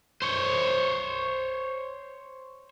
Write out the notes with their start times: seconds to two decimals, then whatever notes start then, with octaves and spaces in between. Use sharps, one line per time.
0.22 C5 C#5